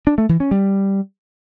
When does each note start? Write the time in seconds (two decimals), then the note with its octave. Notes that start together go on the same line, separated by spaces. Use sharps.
0.07 D4
0.18 A3
0.29 E3
0.40 C#4
0.51 G3